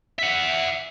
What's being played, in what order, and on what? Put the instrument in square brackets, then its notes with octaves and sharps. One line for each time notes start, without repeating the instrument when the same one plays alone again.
[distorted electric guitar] E5 F#5